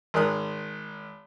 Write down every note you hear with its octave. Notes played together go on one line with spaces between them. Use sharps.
G#1 G#4 A#4 D#6 F#6